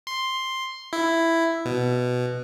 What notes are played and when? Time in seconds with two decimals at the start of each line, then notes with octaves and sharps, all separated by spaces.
0.07 C6
0.93 E4
1.65 B2